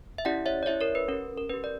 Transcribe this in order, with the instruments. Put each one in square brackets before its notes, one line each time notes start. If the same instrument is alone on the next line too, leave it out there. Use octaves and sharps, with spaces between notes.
[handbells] E5
C#4 E4 G4 D5 F#5
C#5 E5
D5
C#4 E4 G4 C#5 E5
A#4 C#5
B4
C#4 G4 A#4
A#4
C#4 G4 B4
D5